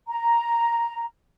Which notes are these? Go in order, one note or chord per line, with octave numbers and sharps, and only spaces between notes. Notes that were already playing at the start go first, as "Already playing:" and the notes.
A#5